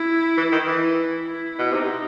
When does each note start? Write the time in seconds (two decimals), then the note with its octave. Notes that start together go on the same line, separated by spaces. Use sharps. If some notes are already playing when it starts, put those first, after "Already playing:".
Already playing: E4
0.37 E3
0.52 D#3
0.67 E3
0.83 E4
1.27 E4
1.59 B2
1.72 C3 D#4